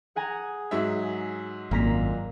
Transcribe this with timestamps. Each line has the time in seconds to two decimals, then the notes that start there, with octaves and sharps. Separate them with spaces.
0.16 G#4 F#5 G#5 A#5
0.71 G#2 F#3 E5
1.71 G#1 F#2 A#2 A#3 A#5 B6